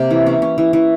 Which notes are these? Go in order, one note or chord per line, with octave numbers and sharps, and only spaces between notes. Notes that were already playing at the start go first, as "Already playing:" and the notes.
Already playing: C3 A#3 G4
E3
C#4
C#4
E3
E3